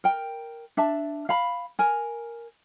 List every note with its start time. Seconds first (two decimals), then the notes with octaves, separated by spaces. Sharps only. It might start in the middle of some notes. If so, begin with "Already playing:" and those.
0.04 A#4 G5
0.77 D4 E5 A5
1.29 F5 B5
1.79 A#4 G#5